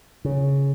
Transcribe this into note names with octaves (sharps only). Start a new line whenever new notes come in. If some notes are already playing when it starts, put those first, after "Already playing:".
C#3